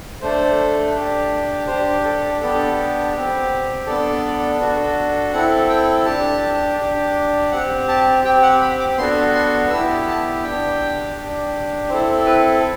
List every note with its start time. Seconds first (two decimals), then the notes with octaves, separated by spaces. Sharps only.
0.21 A3 D4 A4 C5
0.94 D4 G4
1.67 D4 G4 C5
2.04 A4
2.41 B3 D4 G4 A4
3.14 C4 G4
3.86 B3 D4 A4 D5
4.59 D4 F#4 A4
5.33 C4 E4 A4 F#5
5.69 G5
6.05 D4 G4 A5
6.78 D4 G4
7.52 C4 G4 F#5
7.88 A5
8.24 C4 G4 G5
8.42 F#5
8.61 B5
8.80 D6
8.98 B3 D4 F#4 A4 C6
9.34 C6
9.70 B3 E4 G4 E6
10.07 A5
10.43 D4 G5
10.49 G4
11.17 D4 G4
11.90 C4 E4 A4 C5
12.26 B4